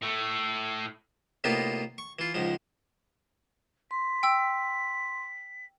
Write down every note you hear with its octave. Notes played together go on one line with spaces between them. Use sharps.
A2 A3
A2 C3 A#3 B3 D#4 F4
C#6
E3 F4
C#2 G#2 F3
C6 B6
G5 E6